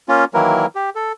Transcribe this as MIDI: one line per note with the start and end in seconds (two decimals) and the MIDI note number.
0.09 0.25 58
0.09 0.25 61
0.09 0.25 65
0.34 0.66 51
0.34 0.66 52
0.34 0.66 54
0.34 0.66 58
0.34 0.66 64
0.34 0.66 70
0.75 0.90 67
0.95 1.12 69